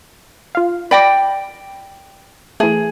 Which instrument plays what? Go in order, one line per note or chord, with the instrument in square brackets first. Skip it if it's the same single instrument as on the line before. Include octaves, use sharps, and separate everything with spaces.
[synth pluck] F4 F5
[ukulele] D5 G5 [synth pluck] B5 D6 A#6
[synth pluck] E3 A3 [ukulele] G#4